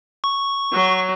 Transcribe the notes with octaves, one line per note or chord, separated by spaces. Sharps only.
C#6
F#3